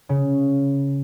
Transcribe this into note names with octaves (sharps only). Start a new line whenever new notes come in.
C#3